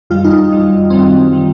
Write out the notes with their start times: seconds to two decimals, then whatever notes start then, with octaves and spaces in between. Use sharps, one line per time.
0.10 F#2 D#3 G3 F4
0.24 D#4
0.51 F#2 D#3 G3
0.90 F#2 D#3 G3 C4
1.33 D#3 G3